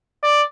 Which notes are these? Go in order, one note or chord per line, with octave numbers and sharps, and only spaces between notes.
D5